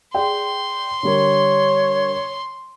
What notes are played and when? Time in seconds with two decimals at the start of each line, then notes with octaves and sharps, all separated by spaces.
0.14 G#4 D5 G5 C6
1.03 D3 G3 A#4 C#5